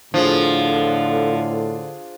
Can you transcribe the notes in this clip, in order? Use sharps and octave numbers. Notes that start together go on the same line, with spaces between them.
A2 D3 F3 D4 F4 G#4